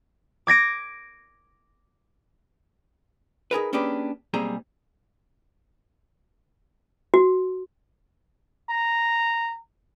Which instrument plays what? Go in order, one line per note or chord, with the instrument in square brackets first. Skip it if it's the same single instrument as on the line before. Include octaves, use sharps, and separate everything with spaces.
[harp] D6 G#6 A#6 D7
[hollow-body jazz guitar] D#4 G#4 A#4 B4
A#3 C#4 D4 G4 G#4 B4
B1 G3 A#3 C4 G#4 A#5
[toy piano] F#4
[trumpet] A#5